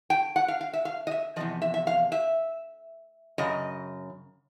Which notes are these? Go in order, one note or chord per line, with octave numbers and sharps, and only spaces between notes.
G5
F#5
F5
F5
E5
F5
D#5
E5
E2 C3 F3 D#5
E5
E5
F5
E5
F#2 C#3 D#5